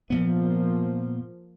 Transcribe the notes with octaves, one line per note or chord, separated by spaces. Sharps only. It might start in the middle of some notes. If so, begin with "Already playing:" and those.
A#2 F3 A#3 B3